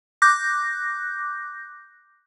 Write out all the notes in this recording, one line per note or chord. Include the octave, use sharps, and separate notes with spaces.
D6 F#6 G6 A#6